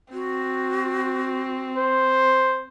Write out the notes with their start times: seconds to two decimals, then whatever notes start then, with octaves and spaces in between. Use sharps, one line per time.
0.13 C4 F#4
1.77 C5